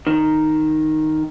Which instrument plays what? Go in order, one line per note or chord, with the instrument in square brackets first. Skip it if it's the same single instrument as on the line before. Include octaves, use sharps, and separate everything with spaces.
[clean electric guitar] D#3